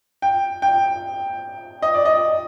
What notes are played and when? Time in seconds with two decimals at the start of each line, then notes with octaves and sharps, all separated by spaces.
0.22 G5
0.62 G5
1.82 D#5
1.94 D5
2.05 D#5